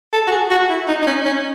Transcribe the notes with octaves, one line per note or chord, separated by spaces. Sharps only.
A4
F#4
G#4
F#4
E4
D#4
D#4
C#4
C#4